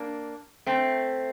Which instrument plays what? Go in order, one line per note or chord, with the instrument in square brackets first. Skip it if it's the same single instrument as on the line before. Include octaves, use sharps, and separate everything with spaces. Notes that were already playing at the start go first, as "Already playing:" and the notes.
Already playing: [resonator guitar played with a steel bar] A#3 D4
A3 C4